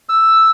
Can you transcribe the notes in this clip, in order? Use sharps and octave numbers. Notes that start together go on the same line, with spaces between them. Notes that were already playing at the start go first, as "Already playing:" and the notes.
E6